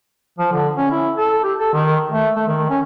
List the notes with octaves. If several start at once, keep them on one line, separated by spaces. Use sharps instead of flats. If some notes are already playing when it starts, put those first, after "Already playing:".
F3
D3
C#4
E4
A4
G4
A4
D#3
A3
A3
D#3
C#4